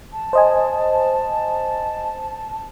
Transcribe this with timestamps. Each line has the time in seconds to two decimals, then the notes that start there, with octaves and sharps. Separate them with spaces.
0.13 A5
0.33 C5 D#5 G#5